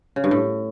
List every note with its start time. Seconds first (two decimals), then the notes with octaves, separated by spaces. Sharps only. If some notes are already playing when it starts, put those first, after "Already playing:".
0.16 C#3
0.24 G2
0.31 A2